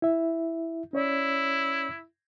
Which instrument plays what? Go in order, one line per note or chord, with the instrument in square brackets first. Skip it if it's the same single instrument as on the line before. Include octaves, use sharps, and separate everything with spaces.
[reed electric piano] E4 E5
[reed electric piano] C#4 C#5 D5 [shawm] E4